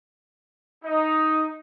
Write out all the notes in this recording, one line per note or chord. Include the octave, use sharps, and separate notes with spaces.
D#4